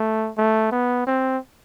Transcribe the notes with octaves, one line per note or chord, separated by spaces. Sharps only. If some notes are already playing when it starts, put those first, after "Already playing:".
Already playing: A3
A3
B3
C4